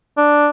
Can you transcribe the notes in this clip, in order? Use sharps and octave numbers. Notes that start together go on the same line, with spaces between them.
D4